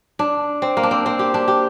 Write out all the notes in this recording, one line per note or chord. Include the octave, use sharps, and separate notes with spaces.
D4
C4
A#3
D4
C4
C4
G4
D4
G4